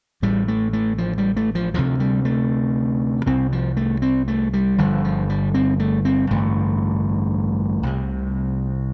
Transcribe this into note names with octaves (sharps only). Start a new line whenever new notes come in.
A1 A2 G3
A3
A3
F3
G3
A3
F3
D2 C3 F3
G3
A3
C2 C3 C4
F3
A3
C4
A3
G3
G1 G2 D3 F3
F3
G3
C4
A3
C4
A1 G2 D3 A3
C2 C3